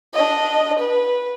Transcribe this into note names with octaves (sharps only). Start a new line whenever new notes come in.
D4 D#5
B4